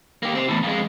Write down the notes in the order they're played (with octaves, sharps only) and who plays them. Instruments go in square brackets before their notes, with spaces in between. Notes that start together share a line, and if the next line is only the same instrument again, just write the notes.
[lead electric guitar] A#3 G4
C4 G4
E2 A2
F2 G#3